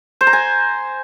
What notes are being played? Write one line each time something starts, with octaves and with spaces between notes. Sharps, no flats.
C5
A#5
G#5